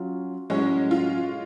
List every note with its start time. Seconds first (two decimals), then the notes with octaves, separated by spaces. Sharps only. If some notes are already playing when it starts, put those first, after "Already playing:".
Already playing: F#3 C#4 F4
0.50 A2 F#3 G#3 C#4
0.91 F4